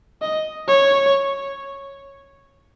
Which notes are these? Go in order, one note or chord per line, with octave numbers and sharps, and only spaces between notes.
D#5
C#5